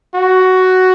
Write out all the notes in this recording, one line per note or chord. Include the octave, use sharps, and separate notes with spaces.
F#4